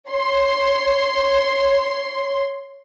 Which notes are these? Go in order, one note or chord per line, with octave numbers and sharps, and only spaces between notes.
C#5 C6